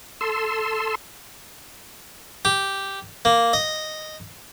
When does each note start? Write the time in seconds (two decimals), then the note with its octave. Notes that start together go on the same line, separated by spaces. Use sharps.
0.21 A4 C6 E6
2.45 G4
3.25 A#3
3.53 D#5